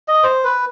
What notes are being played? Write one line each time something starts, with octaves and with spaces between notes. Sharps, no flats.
D#5
C5
B4